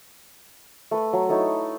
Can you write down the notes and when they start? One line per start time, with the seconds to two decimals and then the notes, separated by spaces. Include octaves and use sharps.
0.91 A3 B4
1.13 F#3
1.29 D#4 E4 A4 C#5